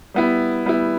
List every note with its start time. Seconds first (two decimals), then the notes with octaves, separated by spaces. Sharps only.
0.14 G3 B3 E4
0.66 G3 B3 E4